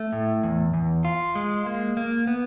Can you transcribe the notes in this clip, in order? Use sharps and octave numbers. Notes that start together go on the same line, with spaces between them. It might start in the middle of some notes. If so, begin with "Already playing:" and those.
Already playing: A3
A2
E2
E2
F4
G#3
A#3
A#3
B3